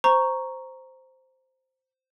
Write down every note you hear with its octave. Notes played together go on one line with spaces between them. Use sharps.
C5 A#5 C#6